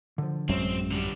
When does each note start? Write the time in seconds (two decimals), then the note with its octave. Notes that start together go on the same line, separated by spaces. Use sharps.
0.18 D3 F3
0.49 A1 F#2 F#3 G#3 C4 C#4 E5
0.91 D3 G3